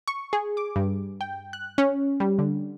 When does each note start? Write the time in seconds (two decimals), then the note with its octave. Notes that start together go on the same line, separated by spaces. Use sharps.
0.08 C#6
0.33 G#4
0.57 D6
0.76 G2
1.21 G5
1.53 F#6
1.78 C#4
2.20 G3
2.39 D3